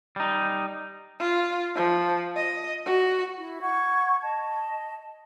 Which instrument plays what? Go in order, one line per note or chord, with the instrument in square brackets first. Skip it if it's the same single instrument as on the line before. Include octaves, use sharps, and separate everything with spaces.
[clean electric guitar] G3 D#4
[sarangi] F4
F3
D#5
F#4
[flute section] E4
F#5 C#6 G#6
D#5 A5